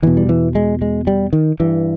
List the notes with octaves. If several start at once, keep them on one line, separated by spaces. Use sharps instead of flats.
E2 B2 E3
G3
E3
G#3
G#3
G3
D#3
G2 E3